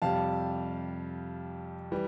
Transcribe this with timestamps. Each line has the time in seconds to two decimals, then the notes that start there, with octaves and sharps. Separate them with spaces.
0.02 F2 C3 G3 F5 A5
1.92 E3 G3